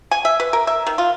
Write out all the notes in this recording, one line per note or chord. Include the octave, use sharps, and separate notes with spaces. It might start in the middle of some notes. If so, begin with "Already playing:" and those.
G#5
E5
B4
A#4
E5
D#3
F4